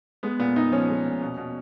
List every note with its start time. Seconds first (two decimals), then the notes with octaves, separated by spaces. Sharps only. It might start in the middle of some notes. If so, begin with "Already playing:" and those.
0.23 G#3 B3
0.39 A#2 B3
0.56 A#2 D#4
0.72 F3 C#4
0.89 G#3
1.05 A#2
1.22 B2
1.37 B2